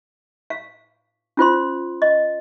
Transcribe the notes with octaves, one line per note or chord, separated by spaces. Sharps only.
F5
C#4 F4 C5 C6
D#5